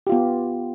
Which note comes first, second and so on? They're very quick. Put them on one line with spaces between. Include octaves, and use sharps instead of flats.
G4 F4 B3